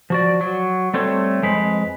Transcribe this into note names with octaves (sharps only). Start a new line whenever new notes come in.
F3 F#4 D5
F#3
G3 A3 C4 A4 C#5
F2 G#3 B4